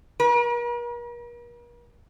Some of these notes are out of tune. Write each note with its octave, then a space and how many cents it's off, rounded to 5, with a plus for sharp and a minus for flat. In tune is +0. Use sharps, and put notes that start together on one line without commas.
A#4 +45